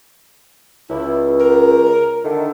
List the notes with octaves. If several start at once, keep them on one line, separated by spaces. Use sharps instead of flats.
C#2 E4
A#4
D3 D#3 A4